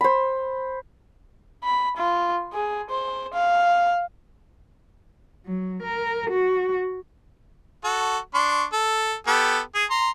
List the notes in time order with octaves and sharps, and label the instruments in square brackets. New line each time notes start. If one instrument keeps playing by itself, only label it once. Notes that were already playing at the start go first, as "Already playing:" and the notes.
[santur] C5 B5
[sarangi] B5
F4
G#4
C5
F5
[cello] F#3
A#4
F#4
[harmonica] F#4 A4
D4 C6 C#6
A4
B3 G4 A4
G#4
A#5 C6